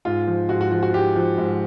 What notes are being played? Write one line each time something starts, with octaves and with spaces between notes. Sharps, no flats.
G#2 F4
F3
G#2 F#4
F#4
F3 F#4
F#4
G#2 G4
F3
G#2